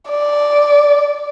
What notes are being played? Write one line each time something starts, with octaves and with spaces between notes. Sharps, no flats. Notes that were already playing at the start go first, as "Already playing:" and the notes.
D5